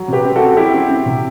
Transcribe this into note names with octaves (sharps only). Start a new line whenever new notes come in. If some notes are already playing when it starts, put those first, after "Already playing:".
Already playing: F#3
C3 G4 B4
C4
F#4 A4
C4
F#3 E4 G4
C4
C4
C3